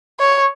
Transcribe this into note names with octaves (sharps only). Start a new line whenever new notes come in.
C#5